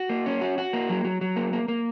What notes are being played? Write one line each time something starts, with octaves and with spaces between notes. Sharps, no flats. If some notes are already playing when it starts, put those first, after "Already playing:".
Already playing: F#4
A#3
C#4
F#4
F#4
A#3
F#3
F#3
F#3
A#3
A#3
A#3